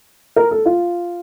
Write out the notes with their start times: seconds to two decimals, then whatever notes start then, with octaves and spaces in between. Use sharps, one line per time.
0.36 A#4
0.51 A4
0.66 F4